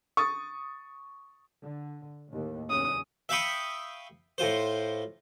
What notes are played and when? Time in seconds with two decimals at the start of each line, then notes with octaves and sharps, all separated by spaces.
0.17 C#6 D#6 A6
1.62 D3
2.30 D#2 A2
2.70 F#1 E2 C#4 D#6
3.29 E5 F5 G5 B5 C#6 D#6
4.38 A2 F4 C5